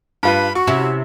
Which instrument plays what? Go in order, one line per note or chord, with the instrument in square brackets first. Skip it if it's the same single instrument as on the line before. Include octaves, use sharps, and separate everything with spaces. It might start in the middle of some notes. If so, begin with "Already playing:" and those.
[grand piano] G2 F4 B4 [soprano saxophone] B5
[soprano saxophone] F#4 [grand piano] C#6
[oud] C3 C#4 E4